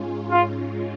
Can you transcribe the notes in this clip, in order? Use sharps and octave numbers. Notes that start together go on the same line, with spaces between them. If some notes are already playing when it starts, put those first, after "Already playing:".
Already playing: G#2 G#3 C#4 F4
F4